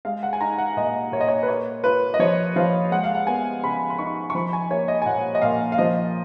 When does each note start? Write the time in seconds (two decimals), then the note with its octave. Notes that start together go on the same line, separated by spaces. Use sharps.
0.05 G#3 F5
0.23 F#5
0.33 G#5
0.41 D#4 A#5
0.58 F#5
0.77 A#2 D#5
1.12 A#2 C#5
1.21 D#5
1.28 C#5
1.43 B4
1.48 A#3 C#5
1.84 F4 B4
2.14 D#5
2.19 F3 C#5
2.56 F3 F5
2.91 G#3 F#5
3.04 F5
3.15 F#5
3.27 B3 G#5
3.63 C#3 B5
3.90 B5
3.98 D#4 C#6
4.30 C#6
4.35 F3 B5
4.53 G#5
4.70 A#3 C#5
4.88 D#5
5.02 G#5
5.06 A#2 F#5
5.35 D#5
5.42 A#2 F5
5.72 F5
5.78 F3 D#5